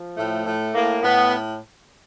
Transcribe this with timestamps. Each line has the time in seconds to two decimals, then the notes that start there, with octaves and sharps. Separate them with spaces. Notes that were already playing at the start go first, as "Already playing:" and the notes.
Already playing: F3
0.16 A2 A3
0.45 A2 A3
0.74 A2 A#3
1.02 A2 B3